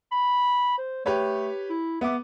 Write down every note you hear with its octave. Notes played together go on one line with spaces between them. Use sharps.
B5
C5
A3 G4 B4 C#5
E4
B3 E5 D6